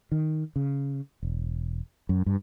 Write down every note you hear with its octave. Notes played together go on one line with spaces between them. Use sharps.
D#3
C#3
E1
F#2
G2